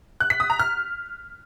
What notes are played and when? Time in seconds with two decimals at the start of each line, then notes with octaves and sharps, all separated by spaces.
0.20 F#6
0.30 B6
0.40 D#6
0.50 A#5
0.59 F6